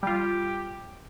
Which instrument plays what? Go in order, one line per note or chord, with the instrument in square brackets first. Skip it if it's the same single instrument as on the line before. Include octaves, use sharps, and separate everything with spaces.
[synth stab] G3 F4 [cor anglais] G4